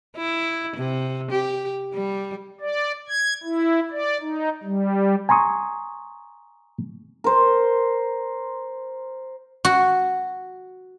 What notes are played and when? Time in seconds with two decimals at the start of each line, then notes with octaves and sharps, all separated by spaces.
0.16 E4
0.76 C3
1.31 G4
1.94 G3
2.61 D5
3.08 G#6
3.44 E4
3.91 D5
4.21 D#4
4.64 G3
5.29 G#5 A#5 C6 C#6 D#6
7.24 A#4 C5
9.65 F#4